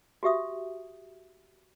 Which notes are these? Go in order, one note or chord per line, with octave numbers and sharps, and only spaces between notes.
F#4 G4 E5 D#6